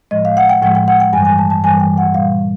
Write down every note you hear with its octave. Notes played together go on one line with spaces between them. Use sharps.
A2 F3 G#3 D#5
F5
F#5
G5
A2 F3 G#3 F#5
G5
F#5
G5
G2 E3 G3 G#5
G#5
A5
A5
G2 E3 G3 G#5
G5
F#5
A#2 G3 F5